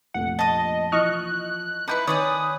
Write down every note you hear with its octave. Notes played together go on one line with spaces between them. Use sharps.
F1 A#1 A3 F#5
D#5 A5 D#6
E3 F3 D#5 C#6 F6 F#6
D#4 E4 B4 A5 D6 G6
D#3 B4 C#5 D5 G#5 D#6